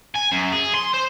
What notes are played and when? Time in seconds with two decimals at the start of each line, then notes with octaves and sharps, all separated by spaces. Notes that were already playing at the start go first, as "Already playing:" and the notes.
0.16 G#5
0.32 F#2
0.52 G#4
0.75 C6
0.94 C5